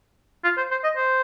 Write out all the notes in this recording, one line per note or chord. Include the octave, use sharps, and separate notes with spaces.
F4
C5
C5
D#5
C5